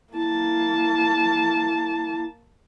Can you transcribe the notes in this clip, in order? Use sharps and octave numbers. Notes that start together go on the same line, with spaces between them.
A#3 E4 A5